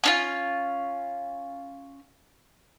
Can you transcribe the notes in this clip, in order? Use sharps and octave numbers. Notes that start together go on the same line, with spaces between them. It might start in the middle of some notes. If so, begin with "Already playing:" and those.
C#4 D4 F4